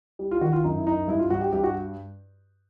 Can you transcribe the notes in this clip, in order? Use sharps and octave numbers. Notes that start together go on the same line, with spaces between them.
G3
F4
D#3 F#4
F4
F#2 D#4
E4
F#2 D#4
G2 E4
F4
G2 F#4
G4
G2 G4
F#4